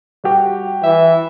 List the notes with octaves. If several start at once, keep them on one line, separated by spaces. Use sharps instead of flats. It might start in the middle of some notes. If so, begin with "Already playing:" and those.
G3 F#4 G4
E3 E5